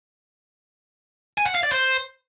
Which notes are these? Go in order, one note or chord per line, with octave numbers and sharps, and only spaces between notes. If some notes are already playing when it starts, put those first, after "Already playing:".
G#5
F#5
F5
D5
C5